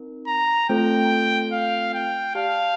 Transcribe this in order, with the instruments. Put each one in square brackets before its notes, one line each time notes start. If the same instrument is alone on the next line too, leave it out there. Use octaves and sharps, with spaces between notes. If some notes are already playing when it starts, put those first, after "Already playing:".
Already playing: [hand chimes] C4 D#4 A#4
[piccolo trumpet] A#5
[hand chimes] A3 C4 F4 A4 C5 [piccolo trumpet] G5
[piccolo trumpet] F5
G5
[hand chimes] G4 D5 A5 [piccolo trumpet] F5